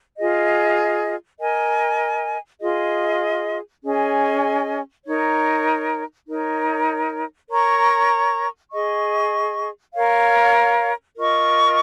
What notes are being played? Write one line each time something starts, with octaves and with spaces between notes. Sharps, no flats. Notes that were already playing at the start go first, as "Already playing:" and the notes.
F4 G#4 D#5
A#4 D#5 G#5
F4 G#4 D#5
C#4 G#4 D#5 G#5
D#4 A#4 C#5
D#4 A#4 C#5
A#4 C#5 A#5 C#6
G#4 D#5 C#6
A#4 C#5 F5
F4 A#4 D#5 C#6